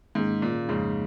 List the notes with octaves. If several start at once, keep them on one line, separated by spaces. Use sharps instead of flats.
G#2 D#3 A#3 C#4 G#4
A#2
F2 G#2 C#3 F3 A#3